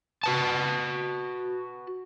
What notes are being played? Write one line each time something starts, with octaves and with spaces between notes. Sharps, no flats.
F#4 B4 A5